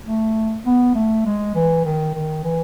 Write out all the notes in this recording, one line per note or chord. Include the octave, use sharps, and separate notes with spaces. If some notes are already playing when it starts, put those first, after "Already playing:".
A3
B3
A3
G#3
E3
D#3
D#3
E3